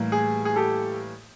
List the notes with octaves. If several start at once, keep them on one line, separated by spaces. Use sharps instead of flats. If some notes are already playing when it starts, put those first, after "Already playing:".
Already playing: A2 E3 G3 A#3
G#4
G#4
G4 A4